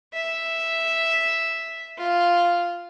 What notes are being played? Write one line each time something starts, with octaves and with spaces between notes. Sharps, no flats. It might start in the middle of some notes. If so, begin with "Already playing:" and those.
E5
F4